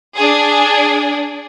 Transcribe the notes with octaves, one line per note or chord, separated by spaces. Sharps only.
D4 G#4